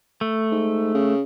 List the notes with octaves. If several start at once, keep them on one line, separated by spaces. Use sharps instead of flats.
A3
G#2
C#3